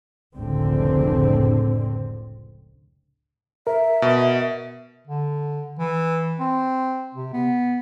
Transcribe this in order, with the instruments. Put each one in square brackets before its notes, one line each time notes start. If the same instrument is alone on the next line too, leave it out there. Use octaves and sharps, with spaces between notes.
[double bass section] F1 C#2 A2 D3 C4
[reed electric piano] A#4 [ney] E5
[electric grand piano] B2
[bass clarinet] D3
E3
C4
C3
B3